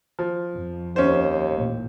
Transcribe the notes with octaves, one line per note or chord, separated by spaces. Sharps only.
F3
F2
D#2 C#4 C5
A1 A#2